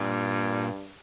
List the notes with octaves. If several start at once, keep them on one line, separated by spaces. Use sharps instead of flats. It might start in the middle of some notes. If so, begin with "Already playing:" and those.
Already playing: G2 A#2